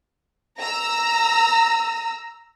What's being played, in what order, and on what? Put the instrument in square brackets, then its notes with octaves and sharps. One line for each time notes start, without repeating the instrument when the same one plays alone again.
[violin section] A#5 E6